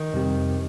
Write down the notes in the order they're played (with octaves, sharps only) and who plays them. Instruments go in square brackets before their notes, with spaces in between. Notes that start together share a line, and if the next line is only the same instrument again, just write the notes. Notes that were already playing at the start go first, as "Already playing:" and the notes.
Already playing: [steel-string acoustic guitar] D#3
[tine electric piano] F2 C3 G3 C4 G4